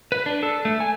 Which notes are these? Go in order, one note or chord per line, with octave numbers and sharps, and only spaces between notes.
B4
D4
A4
A3
G#5